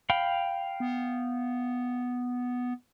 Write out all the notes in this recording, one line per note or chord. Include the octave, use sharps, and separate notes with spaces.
F5 G5 B5
B3